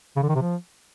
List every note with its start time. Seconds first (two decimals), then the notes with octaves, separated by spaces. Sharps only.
0.16 C#3
0.23 D3
0.29 D#3
0.35 C3
0.42 F3